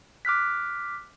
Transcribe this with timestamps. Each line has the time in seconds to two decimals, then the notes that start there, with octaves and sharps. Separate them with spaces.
0.25 D6 F6 F#6 B6